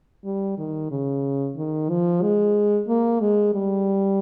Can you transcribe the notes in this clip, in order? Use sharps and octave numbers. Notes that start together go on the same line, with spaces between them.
G3
D#3
C#3
D#3
F3
G#3
A#3
G#3
G3